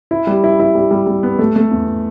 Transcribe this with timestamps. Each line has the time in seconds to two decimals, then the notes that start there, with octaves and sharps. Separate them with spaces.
0.11 E4
0.27 G3
0.44 E4
0.60 E4
0.75 G3
0.91 G3
1.07 G3
1.23 B3
1.39 A3
1.56 A3
1.71 E2